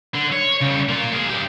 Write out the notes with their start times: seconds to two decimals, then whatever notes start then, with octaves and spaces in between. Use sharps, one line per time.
0.14 D3
0.32 C#5
0.61 C#3 G3
0.89 A#3 F4
1.13 G#4 A#4
1.30 G2 G4